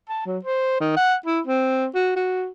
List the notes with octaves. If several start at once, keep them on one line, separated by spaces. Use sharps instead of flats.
A5
F#3
C5
D#3
F#5
E4
C4
F#4
F#4